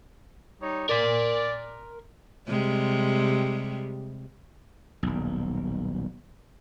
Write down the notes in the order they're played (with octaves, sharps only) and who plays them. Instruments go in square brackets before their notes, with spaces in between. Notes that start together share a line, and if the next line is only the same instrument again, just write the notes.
[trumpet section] G3 D#4 C#5
[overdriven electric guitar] A#4 C6 [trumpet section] D5
[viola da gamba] C3 G3 G#3
[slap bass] D#1 B1